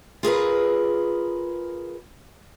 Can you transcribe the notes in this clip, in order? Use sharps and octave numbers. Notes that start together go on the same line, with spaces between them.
F4 G#4 A#4 B4